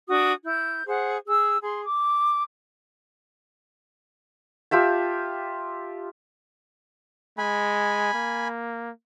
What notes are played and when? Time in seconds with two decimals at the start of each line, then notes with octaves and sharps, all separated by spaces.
0.07 D4 F#4 D#6
0.44 E4 G6
0.87 G#4 C5 F#5
1.27 G#4 E6
1.62 G#4 C6
1.85 D6
4.71 F4 G4 E5 A5
7.38 G#3 G#5 B5
8.14 A#3